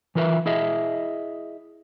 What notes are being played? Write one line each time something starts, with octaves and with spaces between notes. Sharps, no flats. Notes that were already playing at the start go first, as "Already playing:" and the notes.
E3 F4 A#4 B4 E5
E4 G#4 D#5 E5